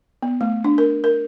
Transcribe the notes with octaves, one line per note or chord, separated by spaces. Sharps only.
B3
A3
D4
A#4
A#4